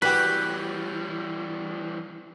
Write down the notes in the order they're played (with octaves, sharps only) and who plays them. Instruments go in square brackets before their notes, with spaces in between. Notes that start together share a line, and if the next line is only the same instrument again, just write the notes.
[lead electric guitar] E3 G3 [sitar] F#4 G4 [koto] B4